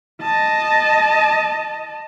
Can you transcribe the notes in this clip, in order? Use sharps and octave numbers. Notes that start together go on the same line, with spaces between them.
D#5 A5